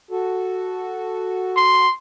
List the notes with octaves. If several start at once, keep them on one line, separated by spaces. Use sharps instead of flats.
F#4 A4
C6